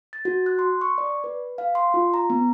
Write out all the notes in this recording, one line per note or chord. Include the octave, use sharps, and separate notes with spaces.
A6
F#4
F#6
C6
C#6
D5
B4
F5
C6
F4
A#5
B3